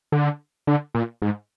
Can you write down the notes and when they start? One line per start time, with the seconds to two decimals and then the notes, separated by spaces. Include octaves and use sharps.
0.12 D3
0.67 D3
0.94 A#2
1.22 G#2